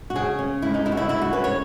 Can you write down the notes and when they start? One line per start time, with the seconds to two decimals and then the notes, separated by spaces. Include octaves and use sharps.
0.10 F#4
0.16 C#3 G#4
0.39 C#4
0.62 G#3 E4
0.74 D#4
0.86 C#3 E4
0.92 F#4
0.97 E4
1.09 C#3 E4
1.21 F#4
1.32 C#4 B4
1.44 C#5